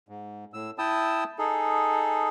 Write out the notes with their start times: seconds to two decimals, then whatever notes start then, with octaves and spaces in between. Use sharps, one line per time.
0.09 G#2
0.54 A2 E6
0.78 E4 G5 A5 D#6 E6
1.39 D#4 G#4 A4